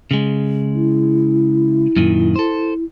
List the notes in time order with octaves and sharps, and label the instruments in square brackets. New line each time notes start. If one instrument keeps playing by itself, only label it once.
[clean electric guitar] C#3 G#3
[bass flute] E4
[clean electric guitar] F#2 A#2 D#3
A4 C5